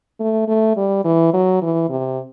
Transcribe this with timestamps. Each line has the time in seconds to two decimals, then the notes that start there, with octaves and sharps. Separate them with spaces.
0.20 A3
0.48 A3
0.77 G3
1.04 E3
1.34 F#3
1.62 E3
1.89 C3